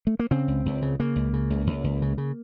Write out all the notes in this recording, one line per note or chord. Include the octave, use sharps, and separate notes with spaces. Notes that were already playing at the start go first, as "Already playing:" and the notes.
A3
A#3
C#3 C4
C#2
C#2
C#3
C#3 A#3
C#2
C#3
C#2
C#2
C#2
C#3
C#3